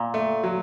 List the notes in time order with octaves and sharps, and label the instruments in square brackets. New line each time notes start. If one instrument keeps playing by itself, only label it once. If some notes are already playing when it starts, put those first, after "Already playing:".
Already playing: [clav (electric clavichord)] A#2
[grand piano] A3
F#3